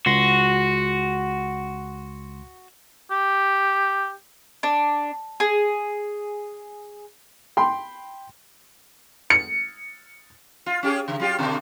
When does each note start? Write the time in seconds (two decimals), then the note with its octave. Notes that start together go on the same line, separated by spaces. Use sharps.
0.06 C#2 F#4 C6 A#6
3.11 G4
4.63 D4
5.40 G#4
7.57 G5 B5 C6
9.30 C#7
10.66 F4
10.83 C#4 G4 G#4
11.08 C#3
11.20 F#3 F4 G4
11.39 B2 D3 D4